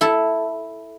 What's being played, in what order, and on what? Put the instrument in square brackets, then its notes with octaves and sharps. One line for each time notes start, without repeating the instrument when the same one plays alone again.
[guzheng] E4 A4